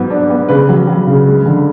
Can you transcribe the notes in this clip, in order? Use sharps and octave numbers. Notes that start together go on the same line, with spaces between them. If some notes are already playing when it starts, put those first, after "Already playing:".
Already playing: G#2 F#3 B3
D4
B3
C#3 B4
F#3
F#3
C#3
G#3
D3